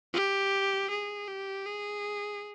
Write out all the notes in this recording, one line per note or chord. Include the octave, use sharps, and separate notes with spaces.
G4
G#4
G4
G#4